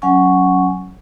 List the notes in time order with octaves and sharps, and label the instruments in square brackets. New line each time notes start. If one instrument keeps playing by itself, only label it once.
[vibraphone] F#3 C#4 F#5 G#5 C#6